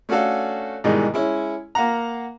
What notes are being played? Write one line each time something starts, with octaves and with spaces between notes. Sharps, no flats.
A3 C#4 D4 F#4 A4 F5
G#2 B2 D#3 E3 G3 G#3
G#3 C#4 E4 C#5
A#3 F5 F#5 A#5